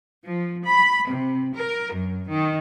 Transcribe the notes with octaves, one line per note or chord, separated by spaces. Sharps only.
F3
B5
C3
A#4
F#2
D#3